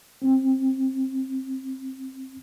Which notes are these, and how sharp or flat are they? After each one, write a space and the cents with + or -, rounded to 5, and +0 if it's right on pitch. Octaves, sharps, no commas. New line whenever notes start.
C4 +20